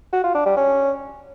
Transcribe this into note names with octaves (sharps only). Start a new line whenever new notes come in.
F#4
F4
D4
G3
C#4